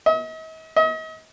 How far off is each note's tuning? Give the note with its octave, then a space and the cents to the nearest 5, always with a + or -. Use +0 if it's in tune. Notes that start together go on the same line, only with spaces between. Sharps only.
D#5 +45
D#5 +40